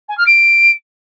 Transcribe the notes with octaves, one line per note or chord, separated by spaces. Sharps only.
G#5
F6
D7